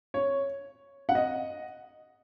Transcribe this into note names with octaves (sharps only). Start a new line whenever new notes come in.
C#5
F#5
D#5